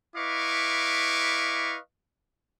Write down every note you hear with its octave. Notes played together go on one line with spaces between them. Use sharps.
E4 B4 D#5 F5 C#6 D6